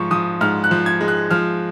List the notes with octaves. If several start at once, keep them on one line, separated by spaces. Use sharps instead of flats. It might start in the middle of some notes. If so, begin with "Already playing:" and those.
Already playing: G#2 F3 C#6
F3 D#6
G#2 F6
F#6
F3
G#6
G#3
F#6
F3 F6